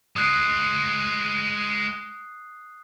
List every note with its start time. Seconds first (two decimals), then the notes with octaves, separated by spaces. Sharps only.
0.16 G#3 F4 D#6 F#6 C7